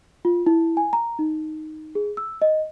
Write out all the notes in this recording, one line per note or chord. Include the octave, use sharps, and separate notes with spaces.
F4
E4
G#5
A#5
D#4
G#4
E6
D#5